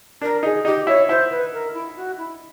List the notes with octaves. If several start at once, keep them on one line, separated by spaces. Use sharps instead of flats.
D4 A#4
D#4 G#4
D#4 G4
E4 C#5
E4 C5
B4
A#4
E4
F#4
E4